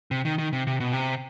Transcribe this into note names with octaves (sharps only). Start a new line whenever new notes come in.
C3
D#3
D#3
C3
C3
B2
C3